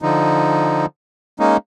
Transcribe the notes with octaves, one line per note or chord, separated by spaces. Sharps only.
D3 F3 D#4
G#3 A#3 C#4 D#4